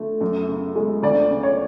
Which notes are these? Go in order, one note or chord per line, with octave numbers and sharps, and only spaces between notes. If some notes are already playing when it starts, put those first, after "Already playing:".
Already playing: D3 A3
F#2
C#3
G#3
D2 D5
C#3
C#5